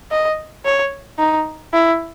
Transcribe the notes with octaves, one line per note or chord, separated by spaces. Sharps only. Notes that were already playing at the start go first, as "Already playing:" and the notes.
D#5
C#5
D#4
E4